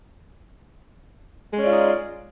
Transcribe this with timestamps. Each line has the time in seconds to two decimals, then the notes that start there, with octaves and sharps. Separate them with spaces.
1.52 G#3
1.57 C#4
1.62 D5
1.67 F4
1.72 D#4